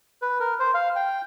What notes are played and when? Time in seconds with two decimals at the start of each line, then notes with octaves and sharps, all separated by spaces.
0.22 B4
0.40 A#4
0.60 C5
0.74 F5
0.96 G5